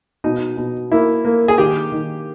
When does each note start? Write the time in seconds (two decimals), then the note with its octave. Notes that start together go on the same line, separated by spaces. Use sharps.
0.24 B2 D#4
0.57 B2
0.92 A#3 E4
1.25 A#3
1.48 G#4
1.58 D#3 G4
1.92 D#3